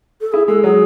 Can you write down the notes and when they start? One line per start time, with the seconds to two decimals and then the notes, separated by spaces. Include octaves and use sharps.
0.21 A4
0.32 E4 G#4
0.48 G#3 A4
0.64 F#3 G#4